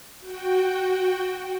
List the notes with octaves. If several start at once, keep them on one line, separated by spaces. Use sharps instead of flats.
F#4 G5